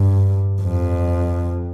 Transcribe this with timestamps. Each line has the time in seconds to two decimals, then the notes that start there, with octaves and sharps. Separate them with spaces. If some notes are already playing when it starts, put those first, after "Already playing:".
Already playing: G2
0.62 F2